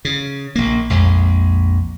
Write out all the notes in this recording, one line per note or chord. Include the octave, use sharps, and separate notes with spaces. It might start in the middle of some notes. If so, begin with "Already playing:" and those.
C#3
A#1 A#3
A#1 F2 G#3